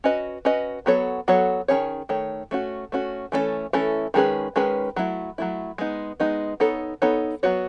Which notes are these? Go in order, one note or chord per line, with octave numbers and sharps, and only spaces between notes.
C#4 F#4 B4 D#5
C#4 F#4 B4 D#5
F#3 B3 F#4 A4 C#5
F#3 B3 F#4 A4 C#5
D#3 A3 C#4 G#4 C#5
D#3 A3 C#5
A3 C#4 F#4
A3 C#4 F#4
E3 A3 C#4 E4 A4
E3 A3 C#4 E4 A4
D#3 G#3 C#4 G#4 B4
D#3 G#3 C#4 G#4 B4
F#3 A3 E4
F#3 A3 E4
G#3 B3 D#4
G#3 B3 D#4
B3 D#4 A4 C#5
B3 D#4 A4 C#5
F#3 B3 F#4 C#5